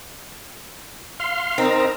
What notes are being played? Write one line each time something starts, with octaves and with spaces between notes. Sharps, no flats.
F5 C6
C4 D#4 A#4 A#5